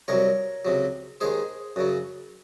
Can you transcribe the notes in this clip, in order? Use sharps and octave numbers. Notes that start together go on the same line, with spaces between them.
C2 C3 F#3 A#4 C#5
C#2 C3 F#3
D#2 D#3 G#3 G#4 C5
F#2 C#3 F#3